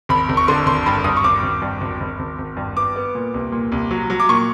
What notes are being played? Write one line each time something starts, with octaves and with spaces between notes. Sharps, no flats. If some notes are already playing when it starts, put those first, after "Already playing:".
G#1 B5
G#1
C#6
D3 C6
G#1 C6
G2 B5
G2 D#6
C#6
G#1 D6
G#1
G2
G#1
G#1
G#1
G#1
G2
B3 D6
B3
A#2
C2
A#2
C2
F#3
F#3
D6
A#2 C#6